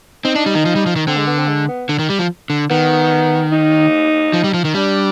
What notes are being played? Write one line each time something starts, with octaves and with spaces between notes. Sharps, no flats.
C4 D#4
D4
G3
D#3
F3
G3
F3
D#3
D3 C4
G#3
B3
C4
G#3
B3
D3
D#3
G3
F3
D3
D#3 B3
D#4
F3
G3
F3
D#3
G3 D4